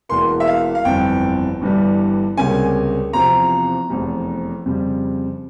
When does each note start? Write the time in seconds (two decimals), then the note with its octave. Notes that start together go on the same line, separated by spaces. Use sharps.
0.09 E1 E2 E3 A#3 C6
0.40 E5
0.47 F5
0.75 F5
0.85 G1 F2 E3 G5
1.61 G1 G2 E3 G3
2.37 C#2 C3 G3 A#3 C#4 G#5
3.13 E2 C3 F3 C4 A#5
3.89 F1 E2 C3
4.66 F2 C#3 G3